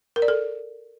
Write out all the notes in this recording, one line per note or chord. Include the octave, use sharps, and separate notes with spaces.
A#4
D5
A4